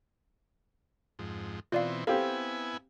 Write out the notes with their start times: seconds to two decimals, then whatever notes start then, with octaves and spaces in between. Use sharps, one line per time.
1.19 F2 G#2
1.72 B2 E3 C4 F4 D5 F5
2.07 B3 C4 E4 G4 A4 F5 G#5